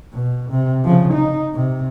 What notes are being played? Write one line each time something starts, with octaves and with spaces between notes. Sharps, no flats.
B2
C3
C#3 F3
D#4
C3